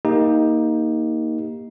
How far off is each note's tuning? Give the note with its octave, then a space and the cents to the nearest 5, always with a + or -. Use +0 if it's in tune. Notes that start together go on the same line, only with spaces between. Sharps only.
A#3 +0 D#4 +15 G4 +10